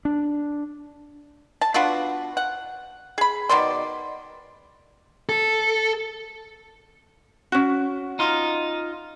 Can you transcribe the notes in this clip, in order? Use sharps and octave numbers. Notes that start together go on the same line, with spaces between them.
D4
A5
B3 D4 F4 F#4
F#5
G#4 B5
B2 D#3 D5 C6
A4
C#4 F#4
D#4 F4